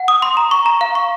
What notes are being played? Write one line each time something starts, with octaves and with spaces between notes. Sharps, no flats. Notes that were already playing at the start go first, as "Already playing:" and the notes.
Already playing: F#5
D#6
C6
A#5
C#6
A#5
F5
C#6